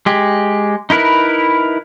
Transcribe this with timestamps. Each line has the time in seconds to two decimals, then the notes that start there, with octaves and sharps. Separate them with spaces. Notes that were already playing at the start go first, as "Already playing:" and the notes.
0.06 G#3 G4
0.90 D#4 E4 A#4 B4